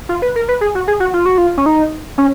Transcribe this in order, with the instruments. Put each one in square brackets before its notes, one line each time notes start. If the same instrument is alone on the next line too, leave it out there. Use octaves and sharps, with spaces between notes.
[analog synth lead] F4
B4
A#4
B4
G#4
F#4
G#4
F#4
F4
F#4
F4
C#4
D#4
C#4